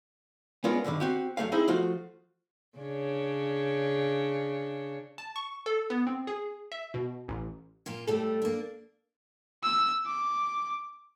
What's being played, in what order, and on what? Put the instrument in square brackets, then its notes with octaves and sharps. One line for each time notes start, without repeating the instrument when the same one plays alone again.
[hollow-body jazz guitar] G#3 B3 C#4 D4 F4 A#4
D2 G2 D3 D#3
C4 F#4 G4
F#2 F3 A3 F5
C4 D#4 E4 G#4 C5 E5
F3 A3 F4 F#4
[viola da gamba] C#3 D4 C#5
[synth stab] A5
C#6
A4
B3
C4
G#4
E5
B2
A1
[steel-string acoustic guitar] A#2 A#3 F4
[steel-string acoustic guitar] A2 G3 A3 [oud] A4
[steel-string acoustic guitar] A#3 D4
[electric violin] E6
D6